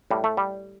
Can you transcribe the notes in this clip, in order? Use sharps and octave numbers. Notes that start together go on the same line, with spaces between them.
A2 G3
A3
G3